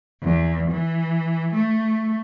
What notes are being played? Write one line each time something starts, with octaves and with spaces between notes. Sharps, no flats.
E2
E3
A3